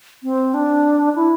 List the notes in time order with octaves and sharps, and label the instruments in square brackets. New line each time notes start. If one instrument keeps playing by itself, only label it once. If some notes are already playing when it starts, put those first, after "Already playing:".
[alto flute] C4
D4
E4